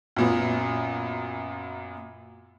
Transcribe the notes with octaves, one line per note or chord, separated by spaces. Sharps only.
F#2 A#2 B3